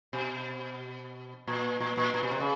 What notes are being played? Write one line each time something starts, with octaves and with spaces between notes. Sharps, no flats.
B2
A#2
A#2
A#2
A#2
B2
C3
C#3